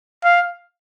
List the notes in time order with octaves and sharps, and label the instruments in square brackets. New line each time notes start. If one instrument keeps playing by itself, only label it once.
[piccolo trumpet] F5